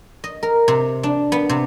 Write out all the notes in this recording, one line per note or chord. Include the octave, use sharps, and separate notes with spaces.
D#5
A#4
C3
D4
B3
C3